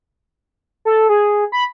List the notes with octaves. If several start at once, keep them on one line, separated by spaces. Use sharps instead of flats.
A4
G#4
B5